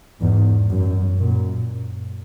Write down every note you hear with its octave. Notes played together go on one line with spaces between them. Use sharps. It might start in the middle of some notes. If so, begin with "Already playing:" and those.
E2 G#2
F#2
F#2 A#2